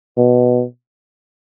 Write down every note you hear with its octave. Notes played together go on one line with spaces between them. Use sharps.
B2